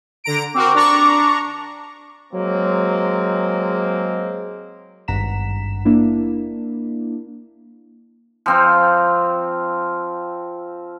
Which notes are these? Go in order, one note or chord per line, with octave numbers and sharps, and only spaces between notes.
D3 A#5 D7
C4 F#4 A#4 D6
D4 A#5 C#6
F#3 G#3 A#3 C4
G#1 G2 F#5 A#5 B6 E7
A#3 D4 E4
F3 C4 F4